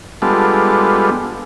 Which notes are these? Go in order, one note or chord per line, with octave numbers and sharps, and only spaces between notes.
G3 G#3 B3 D4 F4 A4